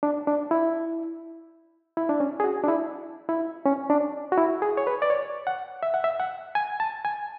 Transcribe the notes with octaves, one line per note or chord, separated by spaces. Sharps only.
D4
D4
E4
E4
D4
C#4
G#4
F#4
D4
E4
E4
C#4
D4
F#4
E4
G#4
C#5
B4
D5
C#5
F#5
E5
F#5
E5
F#5
G#5
A5
G#5